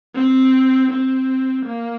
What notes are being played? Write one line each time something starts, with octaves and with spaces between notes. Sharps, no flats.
C4
C4
A#3